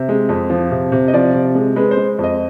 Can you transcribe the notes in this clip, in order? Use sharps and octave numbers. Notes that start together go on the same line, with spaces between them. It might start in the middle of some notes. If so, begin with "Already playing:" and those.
Already playing: C3 E5
G#3
F2
F3
C3
C3
D#5
F3 D5
C3
G#3
G#3 B4
C5
G#3
F2
D#5